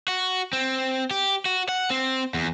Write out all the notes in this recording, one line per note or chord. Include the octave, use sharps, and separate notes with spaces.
F#4
C4
G4
F#4
F#5
C4
E2